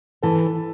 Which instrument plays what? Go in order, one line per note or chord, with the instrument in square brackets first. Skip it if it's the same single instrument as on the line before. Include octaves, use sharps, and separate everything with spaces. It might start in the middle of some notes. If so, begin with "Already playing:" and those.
[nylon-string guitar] E3 [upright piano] A4 A5